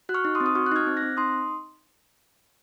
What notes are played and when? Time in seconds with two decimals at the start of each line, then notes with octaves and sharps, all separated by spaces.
0.09 F#4 F#6
0.14 C#6 F6
0.25 D#4
0.35 C6 D#6
0.40 C4
0.46 D#6
0.55 F#4 C#6 F6
0.66 F#6
0.72 D#4 F6 G#6
0.87 C4
0.97 F#6 A#6
1.02 C4
1.17 D#4 C6 D#6